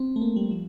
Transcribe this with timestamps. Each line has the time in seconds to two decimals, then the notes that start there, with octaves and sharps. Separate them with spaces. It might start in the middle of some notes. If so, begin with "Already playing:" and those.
Already playing: C4
0.16 A3
0.21 A#3
0.36 G3
0.51 F3